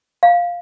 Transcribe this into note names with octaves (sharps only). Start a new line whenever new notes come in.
F5